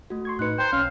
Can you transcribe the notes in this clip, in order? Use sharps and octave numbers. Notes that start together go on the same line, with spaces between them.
A3 F#4
C6 C#6 G#6
A2 D#4 B4 F#6 C#7
C5 G5 A#5 G#6
B1 C#4 F5